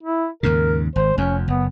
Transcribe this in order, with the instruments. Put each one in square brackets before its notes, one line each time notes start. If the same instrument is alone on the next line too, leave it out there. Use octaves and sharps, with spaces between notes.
[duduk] E4
[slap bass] D#2 G#2 C#3 [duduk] A#4
[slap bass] G#1 [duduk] C5
[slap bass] F1 F2 [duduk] C#4
[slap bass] F#1 [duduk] B3